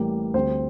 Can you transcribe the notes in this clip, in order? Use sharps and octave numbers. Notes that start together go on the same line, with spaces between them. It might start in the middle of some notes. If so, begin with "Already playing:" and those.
Already playing: A1 A2 G3 A#3
D2 D3 G3 C4 C5